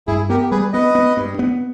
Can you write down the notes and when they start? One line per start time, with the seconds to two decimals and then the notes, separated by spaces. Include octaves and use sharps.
0.07 G2 E4 G#4
0.30 B3 G4 A#4
0.51 G3 G#4 B4
0.73 B3 B4 D#5
0.95 B3
1.17 G2
1.39 B3